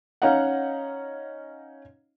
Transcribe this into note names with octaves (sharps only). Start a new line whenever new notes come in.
C#4 D#4 D#5 F5 F#5